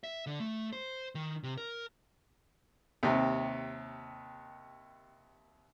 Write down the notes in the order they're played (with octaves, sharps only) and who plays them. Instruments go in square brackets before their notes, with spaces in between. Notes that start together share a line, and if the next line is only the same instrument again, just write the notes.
[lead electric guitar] E5
D3
A3
C5
D#3
C3
A#4
[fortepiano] D#2 C3